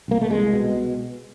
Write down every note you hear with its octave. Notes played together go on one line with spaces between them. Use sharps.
C2 A#3
A3
C2 G#3
B2